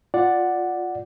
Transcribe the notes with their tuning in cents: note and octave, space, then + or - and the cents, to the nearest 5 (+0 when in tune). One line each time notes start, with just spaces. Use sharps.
F4 +5 D5 +0 F#5 +0